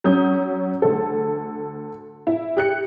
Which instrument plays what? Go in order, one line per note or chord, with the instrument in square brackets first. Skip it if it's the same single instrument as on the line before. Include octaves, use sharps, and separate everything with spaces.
[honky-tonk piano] F#3 C#4 D#6 G6
D2 A4
E4
G4 F#6 C#7